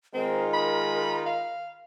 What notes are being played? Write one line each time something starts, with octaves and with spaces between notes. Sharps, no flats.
D#3 G#3 C4 D#4 F4 A#4
B5
F5